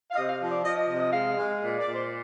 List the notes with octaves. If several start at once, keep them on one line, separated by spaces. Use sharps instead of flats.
F5
C3 D#5
F5
F3
D5
F3 D#5
D#5
C3 D#5
D#5
G#3 F5
G#3
A#2
D5
A#2
C5